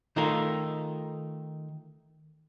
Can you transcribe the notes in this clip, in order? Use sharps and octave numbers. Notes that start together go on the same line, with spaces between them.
D#3 A3 D#4 F4 A4 A#4